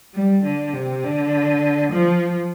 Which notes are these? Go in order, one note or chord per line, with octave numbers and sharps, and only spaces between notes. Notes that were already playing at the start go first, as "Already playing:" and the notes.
G3
D3
C3
D3
F3